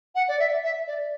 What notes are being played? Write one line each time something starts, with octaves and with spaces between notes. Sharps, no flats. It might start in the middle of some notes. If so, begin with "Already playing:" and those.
F#5
D5
E5
E5
D5